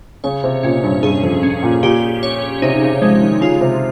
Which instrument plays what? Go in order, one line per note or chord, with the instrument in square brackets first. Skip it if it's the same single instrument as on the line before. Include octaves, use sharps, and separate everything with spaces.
[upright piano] C#3 [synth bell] C#5
[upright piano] C3
[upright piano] A#2 [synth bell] C#4
[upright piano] G2
[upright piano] G2 [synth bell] G#4
[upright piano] F2
[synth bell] C#4
[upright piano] A#2
[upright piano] A#2 [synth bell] G4
[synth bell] C#5
[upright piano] C3 [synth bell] D#4
[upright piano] C#3
[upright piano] F3 [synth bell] G#3
[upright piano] D#3
[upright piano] C#3 [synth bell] F4
[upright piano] C3